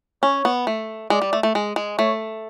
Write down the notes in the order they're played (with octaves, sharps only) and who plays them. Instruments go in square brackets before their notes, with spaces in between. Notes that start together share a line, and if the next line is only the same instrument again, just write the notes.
[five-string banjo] C#4 [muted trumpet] C#5
[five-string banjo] B3
A3
[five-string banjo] G#3 [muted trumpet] D5
[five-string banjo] G3
A3
A3
G#3
G#3
[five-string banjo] A3 [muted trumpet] C#5